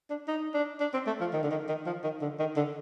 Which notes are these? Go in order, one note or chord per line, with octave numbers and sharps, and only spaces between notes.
D4
D#4
D4
D4
C4
A3
F3
D#3
D3
D#3
D#3
F3
D#3
D3
D#3
D3